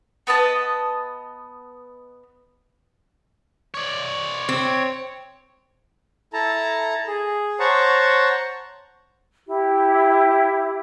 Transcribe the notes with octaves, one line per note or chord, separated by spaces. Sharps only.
B3 B4 D#5 A5
C#5 D5
C4
E4 A4 A5 A#5
G#4
C5 C#5 F#5 A5 A#5 C#6
E4 G4